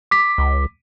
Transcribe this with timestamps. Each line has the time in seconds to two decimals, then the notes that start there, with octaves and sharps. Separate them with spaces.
0.11 D6 B6
0.38 C#2